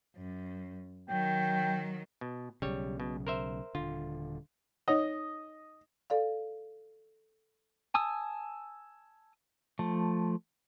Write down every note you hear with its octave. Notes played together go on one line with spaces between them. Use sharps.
F#2
D#3 F#3 G5
B2
B1 C#3 G3 C#5
B2
A#4 C5 E5
D#1 D3 F4
D#4 C#5 D#5 F#5
A4 D5 F5
G#5 A5 D#6 E6
F3 A3